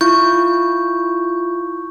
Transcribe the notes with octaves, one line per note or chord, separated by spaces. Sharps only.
E4 F4 C#6 G6